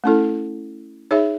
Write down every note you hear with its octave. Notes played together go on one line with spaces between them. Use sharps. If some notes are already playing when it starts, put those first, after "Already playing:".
A3 C#4 E4 A4
D#4 G#4 C#5 E5